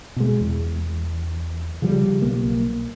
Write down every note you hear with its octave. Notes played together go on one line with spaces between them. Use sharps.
B2 G#3
E2
C#3 F3 G3
B1 A#3